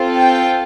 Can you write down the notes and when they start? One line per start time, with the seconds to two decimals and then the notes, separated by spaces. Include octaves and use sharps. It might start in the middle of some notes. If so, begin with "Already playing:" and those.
Already playing: C4 F4 A4
0.17 G5